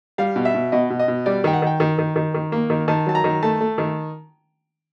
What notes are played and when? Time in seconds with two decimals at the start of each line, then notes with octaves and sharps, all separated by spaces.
0.18 G3 F5
0.36 B2
0.45 E5
0.54 B2
0.72 B2 D#5
0.90 B2
0.99 D#5
1.08 B2
1.26 G3 D5
1.44 D#3 G5
1.53 F#5
1.62 D#3 G5
1.80 D#3
1.98 D#3
2.16 D#3
2.34 D#3
2.52 A#3
2.70 D#3
2.88 D#3 A5
3.07 F#3 A5
3.15 A#5
3.24 D#3
3.43 A3 A5
3.61 A3
3.78 D#3